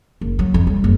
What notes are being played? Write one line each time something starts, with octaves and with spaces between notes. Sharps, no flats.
F#1
F#3
F2
G3
F#1